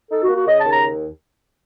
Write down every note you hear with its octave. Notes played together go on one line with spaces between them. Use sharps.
D#4 A4
F#4
A#3
F#4
C#3 D#5
A5
D#2
A#5